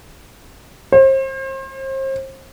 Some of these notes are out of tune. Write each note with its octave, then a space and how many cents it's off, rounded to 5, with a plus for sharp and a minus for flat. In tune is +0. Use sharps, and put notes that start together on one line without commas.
C5 +35